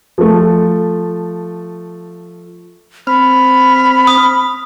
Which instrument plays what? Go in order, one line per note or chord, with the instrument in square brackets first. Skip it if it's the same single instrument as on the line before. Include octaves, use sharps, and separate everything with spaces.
[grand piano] F3 A3
[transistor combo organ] C4 F6 [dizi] B5
[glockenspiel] D#6